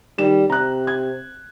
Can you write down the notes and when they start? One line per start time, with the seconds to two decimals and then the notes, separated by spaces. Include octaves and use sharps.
0.18 D#3 G3 D5 E7
0.50 C3 A#5 F#6
0.87 G#6